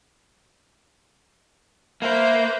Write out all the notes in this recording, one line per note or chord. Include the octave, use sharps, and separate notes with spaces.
A#3 B4 C5 E5